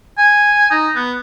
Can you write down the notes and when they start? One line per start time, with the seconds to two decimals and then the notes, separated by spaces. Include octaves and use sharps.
0.17 G#5
0.70 D#4
0.95 B3